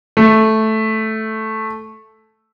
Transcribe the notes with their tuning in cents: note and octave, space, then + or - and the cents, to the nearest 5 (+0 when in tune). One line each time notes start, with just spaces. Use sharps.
A3 -5